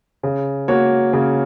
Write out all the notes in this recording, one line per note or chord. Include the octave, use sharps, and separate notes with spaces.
C#3
A#3 F#4 C#5
C#3